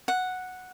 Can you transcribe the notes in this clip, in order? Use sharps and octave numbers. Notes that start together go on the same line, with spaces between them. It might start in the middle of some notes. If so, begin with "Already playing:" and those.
F#5